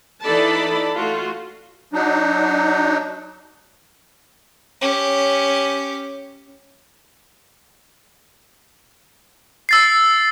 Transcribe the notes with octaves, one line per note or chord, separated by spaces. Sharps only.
E3 D#4 A4 D5 A5 B5
A3 F4 F#4
F#3 D4 D#4
C#4 G4
E6 A6 C7